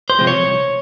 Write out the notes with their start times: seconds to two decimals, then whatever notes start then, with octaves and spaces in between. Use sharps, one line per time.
0.10 C5
0.18 C3 F3 G#3 C4
0.27 C#5
0.44 C2